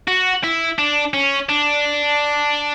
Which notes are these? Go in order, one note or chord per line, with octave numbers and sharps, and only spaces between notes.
F#4
E4
D4
C#4
D4